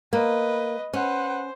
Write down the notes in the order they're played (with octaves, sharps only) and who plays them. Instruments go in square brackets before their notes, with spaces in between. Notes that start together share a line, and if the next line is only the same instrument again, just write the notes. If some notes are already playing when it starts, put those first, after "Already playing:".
[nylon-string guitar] A#3 [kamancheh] B4 [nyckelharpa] D#5
[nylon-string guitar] C#4 [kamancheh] B4 F#5 [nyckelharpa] C5